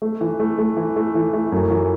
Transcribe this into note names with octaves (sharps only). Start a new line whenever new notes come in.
A3
E3
A3
A3
E3
A3
E3
A3
F#2
E3